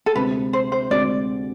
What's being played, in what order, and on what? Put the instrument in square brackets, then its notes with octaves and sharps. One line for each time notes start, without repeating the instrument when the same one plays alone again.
[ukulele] A4
[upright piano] D2 C3 G#3 C4 [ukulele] B4
[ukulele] C5
C5
[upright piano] D2 C3 G#3 C4 [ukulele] D5